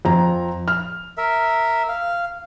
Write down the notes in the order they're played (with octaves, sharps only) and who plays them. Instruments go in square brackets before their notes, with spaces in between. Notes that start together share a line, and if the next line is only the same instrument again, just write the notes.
[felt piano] F2 A#5
F6
[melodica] A#4 E5
F5